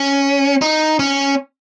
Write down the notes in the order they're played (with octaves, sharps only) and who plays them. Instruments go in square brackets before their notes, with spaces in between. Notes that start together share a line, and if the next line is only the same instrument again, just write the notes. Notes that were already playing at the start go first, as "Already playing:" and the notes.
Already playing: [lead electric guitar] C#4
D#4
C#4